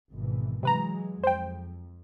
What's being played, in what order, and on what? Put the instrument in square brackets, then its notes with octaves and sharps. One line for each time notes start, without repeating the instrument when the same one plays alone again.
[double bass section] G#1 B2 E3
[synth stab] C3 B4 A#5 [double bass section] E3 F#3 G#3
[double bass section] F2 [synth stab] C5 G5